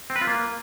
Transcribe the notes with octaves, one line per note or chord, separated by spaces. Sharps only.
C4
B4
F4
A#3